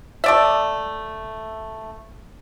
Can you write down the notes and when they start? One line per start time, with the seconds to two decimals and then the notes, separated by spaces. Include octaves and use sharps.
0.24 A3 D5 E5